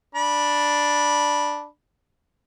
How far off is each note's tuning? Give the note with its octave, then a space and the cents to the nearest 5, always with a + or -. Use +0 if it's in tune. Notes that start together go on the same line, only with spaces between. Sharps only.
D4 +0 B5 -15